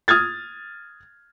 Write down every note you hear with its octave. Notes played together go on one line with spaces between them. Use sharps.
D#6 F6 G#6 A6